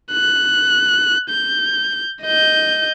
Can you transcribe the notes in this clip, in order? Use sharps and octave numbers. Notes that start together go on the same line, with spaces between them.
F#6
G6
D#5 G6